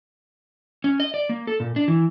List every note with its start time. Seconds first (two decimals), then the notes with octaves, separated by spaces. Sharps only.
0.84 C#4
1.00 D#5
1.14 D5
1.29 A#3
1.47 A4
1.60 A#2
1.76 D4
1.88 E3